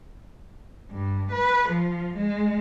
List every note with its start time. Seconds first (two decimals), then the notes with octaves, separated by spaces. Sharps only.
0.91 G2
1.32 B4
1.69 F3
2.17 G#3